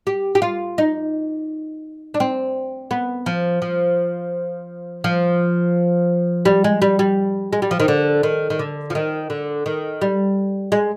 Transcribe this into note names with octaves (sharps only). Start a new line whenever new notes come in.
G4
G4
F4
D#4
D4
C4
B3
F3
F3
F3
G3
G#3
G3
G3
G#3
G3
F3
D#3
D3
D#3
D#3
D3
F3
D#3
D3
D#3
G3
G#3